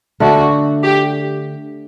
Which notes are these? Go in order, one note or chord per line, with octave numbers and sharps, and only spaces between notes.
D3 A3 D4 F#4
G4